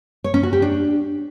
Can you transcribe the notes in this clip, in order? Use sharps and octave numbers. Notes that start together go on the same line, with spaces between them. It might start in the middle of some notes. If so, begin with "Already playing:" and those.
C#5
C#4
F#4
G4
D4